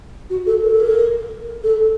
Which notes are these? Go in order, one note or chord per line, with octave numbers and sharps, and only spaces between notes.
F#4
A4
A#4
A4
A#4
A4